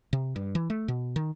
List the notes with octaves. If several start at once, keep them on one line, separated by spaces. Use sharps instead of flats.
C3
G2
E3
A3
B2
D#3